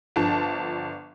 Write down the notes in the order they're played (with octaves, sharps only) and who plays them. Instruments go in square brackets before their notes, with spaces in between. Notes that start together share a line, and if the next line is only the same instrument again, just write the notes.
[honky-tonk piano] G1 D3 F3 A5